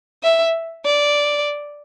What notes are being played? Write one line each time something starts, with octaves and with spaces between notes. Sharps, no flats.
E5
D5